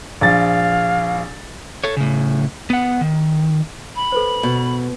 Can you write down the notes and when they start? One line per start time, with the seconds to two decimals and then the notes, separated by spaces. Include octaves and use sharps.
0.21 A#1 F5 A6
1.84 A4 C#5
1.97 A2 C#3
2.70 B3 F#5
3.01 D#3
3.95 B5
4.12 A4 B4 C5
4.43 B2